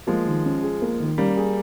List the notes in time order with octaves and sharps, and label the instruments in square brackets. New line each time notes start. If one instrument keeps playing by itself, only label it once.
[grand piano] F3 G#3 [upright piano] A#3
[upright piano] D#3
C#4
G#4
A#3
D#3
[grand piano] G3 A#3 [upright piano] C#4
[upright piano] G#4